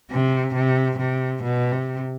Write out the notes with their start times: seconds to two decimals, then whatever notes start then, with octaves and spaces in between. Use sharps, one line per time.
0.11 C3
0.55 C3
0.98 C3
1.43 B2
1.72 C3